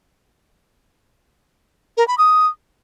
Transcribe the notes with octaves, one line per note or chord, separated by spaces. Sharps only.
A#4
B5
D#6